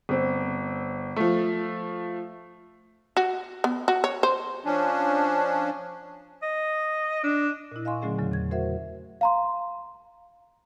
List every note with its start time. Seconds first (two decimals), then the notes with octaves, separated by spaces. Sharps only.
0.09 G1 C4
1.16 F3 A3
3.17 F#4
3.64 B3
3.88 F#4
4.04 C#5
4.23 C5
4.65 F3 C#4 D4
6.42 D#5
7.23 D4
7.72 A#2 E4
7.85 D#5 F5 G#5 C6 C#6
8.02 A#2 D3 F#3 A3 C#4 G#4
8.18 E2 C#3 F#3
8.31 E2 G#6
8.51 A3 F#4 A#4 C5 E5 F#5
9.21 F5 A#5 C6